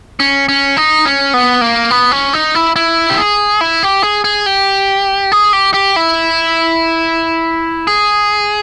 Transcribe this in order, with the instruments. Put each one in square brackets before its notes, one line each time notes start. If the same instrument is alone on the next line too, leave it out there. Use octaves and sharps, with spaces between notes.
[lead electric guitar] C#4
C#4
D#4
C#4
B3
A#3
B3
C#4
D#4
E4
E4
G4
G#4
E4
G4
G#4
G#4
G4
G#4
G4
G4
E4
G#4